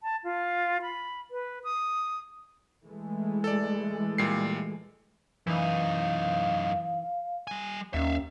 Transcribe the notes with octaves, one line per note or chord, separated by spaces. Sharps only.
A5
F4
B5
B4
D#6
E3 G#3 A3
A4 D5
A#2 G3 C7
F#2 E3 D#4 F5
G3 G#5
D#2 C#4 E5 F5